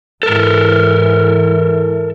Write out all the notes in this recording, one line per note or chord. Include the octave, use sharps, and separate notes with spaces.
G#2 E3 A4 A#4